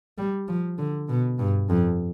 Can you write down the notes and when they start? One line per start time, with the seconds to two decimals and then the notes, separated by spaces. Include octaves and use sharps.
0.18 G3
0.48 F3
0.78 D3
1.09 B2
1.39 G2
1.70 F2